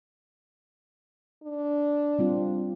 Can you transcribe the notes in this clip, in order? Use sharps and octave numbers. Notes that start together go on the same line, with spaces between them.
D4
G3 C4 F4